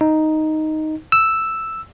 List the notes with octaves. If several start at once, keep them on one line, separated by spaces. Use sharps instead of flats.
D#4
E6